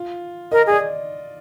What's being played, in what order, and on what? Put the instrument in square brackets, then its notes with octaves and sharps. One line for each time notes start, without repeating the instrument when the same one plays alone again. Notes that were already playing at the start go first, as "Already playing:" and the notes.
Already playing: [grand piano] F4
[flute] A#4 [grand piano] D#5
[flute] G#4 [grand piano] D5